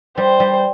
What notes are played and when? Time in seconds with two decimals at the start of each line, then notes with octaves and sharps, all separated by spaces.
0.17 G3 C5
0.40 G3